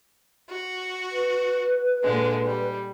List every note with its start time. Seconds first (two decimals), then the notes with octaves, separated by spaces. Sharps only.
0.48 F#4
1.12 B4
2.03 A#2 D3 G#3
2.45 G3